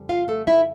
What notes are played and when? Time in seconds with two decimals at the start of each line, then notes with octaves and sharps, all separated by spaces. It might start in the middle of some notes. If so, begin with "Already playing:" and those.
Already playing: F2 C#3 G3
0.09 F4 F5
0.28 A3 A4
0.47 E4 E5